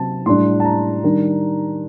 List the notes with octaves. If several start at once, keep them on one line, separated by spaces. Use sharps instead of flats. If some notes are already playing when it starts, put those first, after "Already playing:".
Already playing: C3 F#3 C4 A5
A2 G3 D4 C6
A5
A#5
D#3 G3 D4